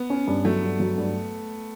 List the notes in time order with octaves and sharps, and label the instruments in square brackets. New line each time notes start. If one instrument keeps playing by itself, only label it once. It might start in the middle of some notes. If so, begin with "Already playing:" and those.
Already playing: [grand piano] B3
[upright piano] C#4
G2
[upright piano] F#3 [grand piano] A3
[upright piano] G2
F#3
G2